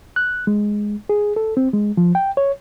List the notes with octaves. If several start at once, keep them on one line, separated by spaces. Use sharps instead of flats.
F#6
G#3
G#4
A4
C4
G#3
F3
G5
C#5